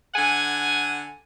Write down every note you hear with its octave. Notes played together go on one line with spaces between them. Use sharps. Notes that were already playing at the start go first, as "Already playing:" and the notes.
D3 F#5 G#5